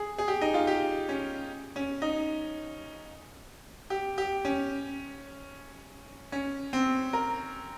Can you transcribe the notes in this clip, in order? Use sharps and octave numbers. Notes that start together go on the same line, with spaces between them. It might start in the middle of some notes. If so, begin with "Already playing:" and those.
Already playing: G#4
G#4
G4
D#4
F4
G4
C#4
C#4
D#4
G4
G4
C#4
C#4
C4
A#4